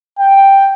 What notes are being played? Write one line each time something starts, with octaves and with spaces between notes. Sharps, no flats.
G5